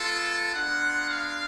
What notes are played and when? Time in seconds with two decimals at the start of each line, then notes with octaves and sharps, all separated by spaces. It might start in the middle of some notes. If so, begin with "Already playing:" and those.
Already playing: G#3 B3 F4 A4
0.53 G#3 B3 D4 F4 F#5
1.08 F5